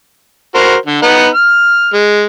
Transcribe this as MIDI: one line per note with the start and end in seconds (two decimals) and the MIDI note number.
0.55 0.75 66
0.55 0.75 70
0.55 0.75 72
0.86 1.01 50
1.03 1.27 59
1.03 1.27 63
1.03 1.27 78
1.35 1.91 89
1.94 2.27 56